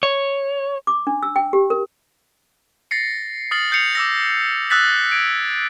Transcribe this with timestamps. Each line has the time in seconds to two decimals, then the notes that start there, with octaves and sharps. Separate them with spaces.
0.03 C#5
0.87 D6
1.07 D4
1.23 E6
1.36 G5
1.53 G4
1.70 A#4
2.91 A6 A#6 C7 C#7
3.51 D#6 F6 A6 C7 F#7
3.71 D#6 G6 C7 C#7 F7
3.95 D6 E6 A#6
4.70 D#6 E6 F#6 A6 B6 F#7
5.12 G#6 D7